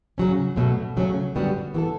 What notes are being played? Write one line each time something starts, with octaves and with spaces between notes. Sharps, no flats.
C#3 F#3 C#4
B2 F#3 A3
C#3 F#3 A3 C#4
F#2 D3 G3 B3 F#4
E3 B3 F#4 A4